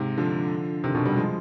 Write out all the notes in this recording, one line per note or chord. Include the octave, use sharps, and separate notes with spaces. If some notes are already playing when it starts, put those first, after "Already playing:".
Already playing: G#2 C3
D3 F3
C3 D#3
B2 D3
D#3 G3
F3 G#3